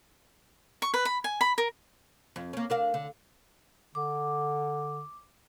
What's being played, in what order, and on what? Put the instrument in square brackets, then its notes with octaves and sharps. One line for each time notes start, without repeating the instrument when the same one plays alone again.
[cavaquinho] C#6
B4
B5
G#5
B5
A#4
[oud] F2
A#3 C#4
D4 A#4 F5
D3
[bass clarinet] D3 [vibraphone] D6